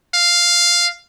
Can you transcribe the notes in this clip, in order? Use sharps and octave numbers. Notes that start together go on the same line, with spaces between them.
F5